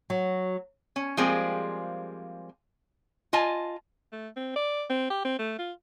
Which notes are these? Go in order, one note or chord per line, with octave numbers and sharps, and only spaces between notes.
F#3 F#4
C#4
F3 G3 G#3 A#3 C4 G#4
F4 D#5 G#5 A5
A3
C4
D5
C4
G4
C4
A3
F4